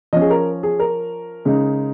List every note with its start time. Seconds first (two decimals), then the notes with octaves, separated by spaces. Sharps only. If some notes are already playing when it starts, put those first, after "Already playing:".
0.13 F3 C#4 D#5
0.21 G#4
0.30 A#4
0.63 G#4
0.79 A#4
1.45 C#3 G#3 D#4